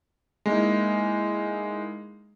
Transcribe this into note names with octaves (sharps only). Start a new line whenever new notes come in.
G#3 A#3 D#4 E4